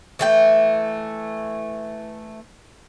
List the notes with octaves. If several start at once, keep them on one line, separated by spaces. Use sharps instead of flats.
E3 A3 G5